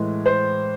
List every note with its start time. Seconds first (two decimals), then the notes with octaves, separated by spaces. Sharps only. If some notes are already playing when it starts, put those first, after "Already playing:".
Already playing: A2 E3 G#3
0.26 C5